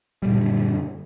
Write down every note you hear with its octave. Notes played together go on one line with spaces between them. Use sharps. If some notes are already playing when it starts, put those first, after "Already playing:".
F#2 A#2 D3 G3